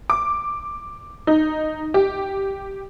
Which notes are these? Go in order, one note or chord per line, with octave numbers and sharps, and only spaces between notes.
D6
D#4
G4